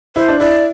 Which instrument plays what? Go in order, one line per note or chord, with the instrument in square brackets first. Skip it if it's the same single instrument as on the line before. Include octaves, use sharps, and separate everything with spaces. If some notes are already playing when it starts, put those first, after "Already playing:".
[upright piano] E4 [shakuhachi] C5
[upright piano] D4
[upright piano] E4 [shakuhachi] D5